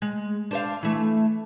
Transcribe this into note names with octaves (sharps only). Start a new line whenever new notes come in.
G#3
D4 C5 F5
E3 A3